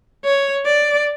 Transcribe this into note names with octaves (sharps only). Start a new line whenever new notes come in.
C#5
D5